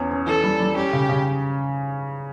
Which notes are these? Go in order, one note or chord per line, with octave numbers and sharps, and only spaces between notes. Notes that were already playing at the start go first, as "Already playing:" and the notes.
Already playing: E2 C#4
C#4
E3 A4
G3
G3
C#4 G4
C#3
C#3